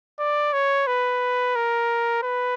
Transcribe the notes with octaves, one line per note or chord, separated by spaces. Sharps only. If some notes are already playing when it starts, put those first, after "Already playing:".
D5
C#5
B4
A#4
B4